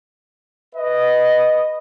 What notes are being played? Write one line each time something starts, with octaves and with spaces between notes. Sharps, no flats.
B4 D#5